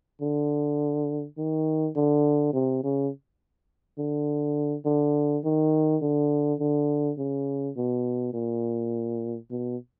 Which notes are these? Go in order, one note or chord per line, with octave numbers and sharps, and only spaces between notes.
D3
D#3
D3
C3
C#3
D3
D3
D#3
D3
D3
C#3
B2
A#2
B2